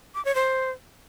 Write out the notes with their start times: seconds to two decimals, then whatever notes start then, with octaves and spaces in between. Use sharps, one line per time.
0.15 D6
0.25 C#5
0.35 C5